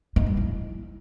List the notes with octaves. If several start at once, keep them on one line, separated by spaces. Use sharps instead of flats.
D#4
G3
E4